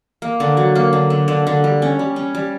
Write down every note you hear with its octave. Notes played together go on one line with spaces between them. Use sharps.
A#3
D3
F#3
A#3
D3
D3
D3
D3
G3
C#4
G3
C#4
G3